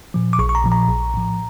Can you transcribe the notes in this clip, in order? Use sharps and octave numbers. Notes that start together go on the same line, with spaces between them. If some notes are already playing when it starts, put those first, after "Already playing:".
A#2 F3
D6
A#1 C#6
C#6
A#5
A#2 F3
A#5
A#1
A2 F3